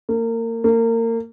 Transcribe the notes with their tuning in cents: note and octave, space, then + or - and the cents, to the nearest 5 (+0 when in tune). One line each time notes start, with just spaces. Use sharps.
A#3 -30
A#3 -30